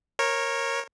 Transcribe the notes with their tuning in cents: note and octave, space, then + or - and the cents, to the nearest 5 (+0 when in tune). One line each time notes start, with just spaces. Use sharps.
A#4 +0 C#5 -20